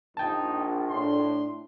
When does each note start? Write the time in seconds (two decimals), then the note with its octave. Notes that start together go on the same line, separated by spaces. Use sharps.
0.17 A#1 D#4 G5 A5
0.90 A2 D4 C6